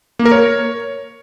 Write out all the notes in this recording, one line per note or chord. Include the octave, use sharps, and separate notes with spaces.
A#3
A#4
C#5